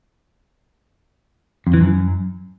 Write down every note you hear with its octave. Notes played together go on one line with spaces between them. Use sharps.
F2
E3
F#2